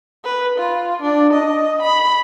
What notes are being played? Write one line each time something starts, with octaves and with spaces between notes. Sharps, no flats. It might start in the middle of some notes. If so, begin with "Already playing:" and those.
B4
F4
D4
D#5
B5